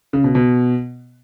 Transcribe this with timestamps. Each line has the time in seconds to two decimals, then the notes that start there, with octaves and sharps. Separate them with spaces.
0.13 C#3
0.24 B2
0.35 B2